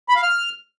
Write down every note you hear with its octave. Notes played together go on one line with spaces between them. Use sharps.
B5
F5
F6